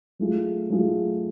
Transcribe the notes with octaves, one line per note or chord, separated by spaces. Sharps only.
F#3 A3 F4 G#4
F#3 A3 F4 G#4